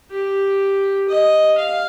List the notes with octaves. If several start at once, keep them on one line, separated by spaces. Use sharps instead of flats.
G4
D#5
F5